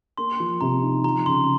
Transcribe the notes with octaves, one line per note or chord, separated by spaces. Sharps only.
A#3 C6
F3
C3 A#5
D#4
F3 A#5
C#3 C6